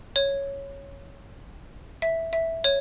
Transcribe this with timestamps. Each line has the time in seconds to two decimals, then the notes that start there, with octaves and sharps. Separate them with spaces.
0.16 C#5
2.02 E5
2.33 E5
2.64 C#5